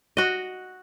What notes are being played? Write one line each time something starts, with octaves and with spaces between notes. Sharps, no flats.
F#4 D#5